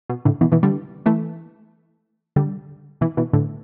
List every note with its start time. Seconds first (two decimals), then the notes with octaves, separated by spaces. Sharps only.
0.09 B2
0.25 A2 D3
0.41 B2 E3
0.52 B2 E3
0.63 D3 G3
1.06 E3 A3
2.36 D3 G3
3.01 B2 E3
3.17 B2 E3
3.33 A2 D3